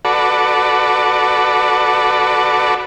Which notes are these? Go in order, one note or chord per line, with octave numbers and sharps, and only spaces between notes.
F#4 A4 B4 D5